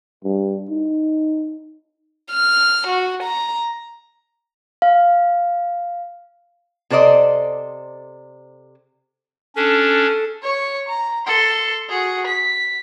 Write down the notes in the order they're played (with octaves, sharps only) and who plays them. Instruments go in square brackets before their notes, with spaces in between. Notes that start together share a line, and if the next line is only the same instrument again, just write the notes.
[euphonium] G2
D#4
[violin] F6
F#4
A#5
[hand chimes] F5
[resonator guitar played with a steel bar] C3 A4 C5 D5 D#5
[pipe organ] C#4 D4 [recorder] A4
[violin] C#5 C#6
A#5
A4 C6
F#4 G#4
B6